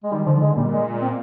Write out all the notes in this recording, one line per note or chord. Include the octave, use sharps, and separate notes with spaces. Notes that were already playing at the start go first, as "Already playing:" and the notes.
G#3
D#3 G3
D3 F3
D3 G#3
A#2 G3
G#3
C4